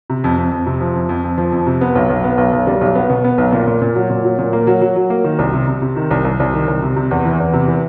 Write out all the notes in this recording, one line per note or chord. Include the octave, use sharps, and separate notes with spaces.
C3
F2
F2
F2
C3
F3
F2
F2
F2
F3
F2
C3
B3
B1
B1
B3
B1
B1
G3
B1
B3
B2
B3
B1
A#2
A#2
A#2
F#3
A#2
F#3
A#2
A#3
F#3
F#3
F#3
A#3
D#3
C2
C3
C3
C3
D#3
C2
C2
C2
D#3
C2
C3
C3
E2
E3
E2
C3
E3